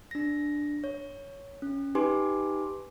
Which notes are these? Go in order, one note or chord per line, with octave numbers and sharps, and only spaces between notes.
D4 A#6
C#5
C#4
D#4 G4 B4 G#5 C6 D6